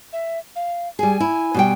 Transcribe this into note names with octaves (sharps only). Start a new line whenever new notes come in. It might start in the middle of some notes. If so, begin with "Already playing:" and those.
E5
F5
G3 G#4 G#5
E4
B2 G3 G5